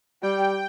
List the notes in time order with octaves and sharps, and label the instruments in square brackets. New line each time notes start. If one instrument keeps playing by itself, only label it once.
[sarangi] G3 [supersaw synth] G5